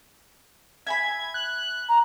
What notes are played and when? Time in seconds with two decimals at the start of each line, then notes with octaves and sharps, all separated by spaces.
0.87 E5 G#5 B5 G#6
1.34 F#6
1.89 A#5